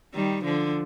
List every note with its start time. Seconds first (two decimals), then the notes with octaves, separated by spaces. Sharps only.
0.14 D#3 G3
0.44 D3 F3